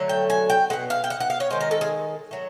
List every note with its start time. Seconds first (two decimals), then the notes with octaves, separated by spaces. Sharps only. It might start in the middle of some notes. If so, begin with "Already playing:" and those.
Already playing: D3 F#3 A3
0.09 G5
0.30 G#5
0.50 G5
0.70 G#3 F#5
0.73 B2
0.90 F5
1.04 G5
1.10 F#5
1.20 F#5
1.30 F5
1.40 C#5
1.50 D#3 G#3 C5
1.60 A#4
1.71 A4
1.81 G#4
2.31 F#3 A3